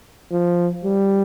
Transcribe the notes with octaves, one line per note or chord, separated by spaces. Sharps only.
F3
G3